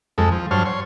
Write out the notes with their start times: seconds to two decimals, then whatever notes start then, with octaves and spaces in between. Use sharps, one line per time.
0.18 F2 G#3 A4
0.32 F3
0.51 G2 F#3 C5 C#5 A5 F6
0.66 C#5 C6